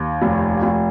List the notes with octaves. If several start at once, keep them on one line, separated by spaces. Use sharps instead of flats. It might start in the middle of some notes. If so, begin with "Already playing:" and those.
Already playing: D#2
F1
F1